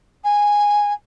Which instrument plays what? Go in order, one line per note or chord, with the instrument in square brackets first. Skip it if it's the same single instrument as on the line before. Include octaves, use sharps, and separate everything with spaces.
[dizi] G#5